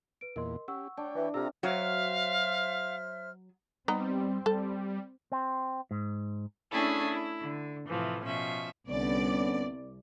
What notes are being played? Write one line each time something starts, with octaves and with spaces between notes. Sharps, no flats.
B4 D7
E2 A#2 A#4 D#5 C6
C#4 G4 F#5 C#6 E6
D4 C#5 G5
E3
C3 F4 A4 A#5 E6 F6
F#3 F#4 C5 C#5 E5 F5 F6
G3 B3 C4 D#4 A#5
G3 A4
C4
G#2
A3 C#4 D4 E4 G#4 A4
E4
D3
A2 C3 E3 F3
B2 F3 C#4 E5
C2 D3 B3 C#4 D5